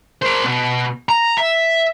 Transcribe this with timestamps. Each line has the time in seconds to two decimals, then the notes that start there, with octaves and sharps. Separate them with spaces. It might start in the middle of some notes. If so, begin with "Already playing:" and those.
0.22 A#4 C5
0.44 B2
1.09 A#5
1.38 E5